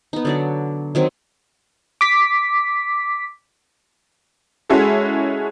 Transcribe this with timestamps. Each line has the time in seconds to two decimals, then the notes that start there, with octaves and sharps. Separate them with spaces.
0.13 B3 D#4
0.25 D3 F#3 D5
0.95 D#3 F#3 C4
2.01 D6 B6
4.69 G#3 C#4 E4 F#4 G#4 A4